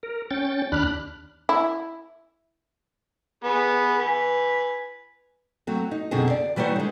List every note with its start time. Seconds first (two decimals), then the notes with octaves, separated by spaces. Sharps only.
0.03 A#4
0.31 C#4 G5 A6
0.72 D#2 D4 B5 F6 F#6
1.49 E4
3.44 B3 G#4 B4
3.99 B4 G#5
5.67 F#3 A3 C4
5.91 D#4
6.11 F#2 B2 D3 C4 G#4
6.30 D5
6.56 E3 G3 D#4 F#4 C5 C#5
6.76 D3 G#3